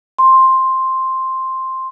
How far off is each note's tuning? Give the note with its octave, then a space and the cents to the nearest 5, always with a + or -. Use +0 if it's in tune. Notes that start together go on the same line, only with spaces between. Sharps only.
C6 +5